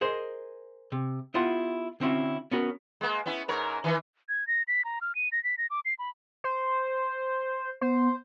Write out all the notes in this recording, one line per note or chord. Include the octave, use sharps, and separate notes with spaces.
G#4 A#4 C5 D#5
C3
B3 E4 F4 G4 F#5
D3 C4 C#4 E4 F#4
B3 C#4 F#4 A#4 C#5
G#3 A#3
B3 C#4 E4
G#2 A#4 C#5
D#3 E3
G#6
A#6
B6
A#5
F6
D#7
A#6
B6
A#6
D6
C7
B5
C5
B3 C5